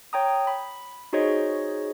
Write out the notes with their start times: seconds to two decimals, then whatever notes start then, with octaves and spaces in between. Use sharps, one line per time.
0.13 C#5 G5 A#5 D#6
0.47 B5
1.13 D#4 F#4 G#4 C5 C#5 D#5